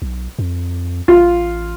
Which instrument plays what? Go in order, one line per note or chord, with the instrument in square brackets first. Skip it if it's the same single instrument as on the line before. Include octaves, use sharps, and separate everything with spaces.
[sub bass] B1
F2
[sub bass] A1 [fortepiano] F4